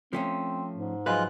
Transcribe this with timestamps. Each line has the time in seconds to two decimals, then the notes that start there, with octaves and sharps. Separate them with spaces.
0.13 F3 A3 C4 C#4
0.76 G#2
1.06 F3 F#3 G#3 F4 B4 F#6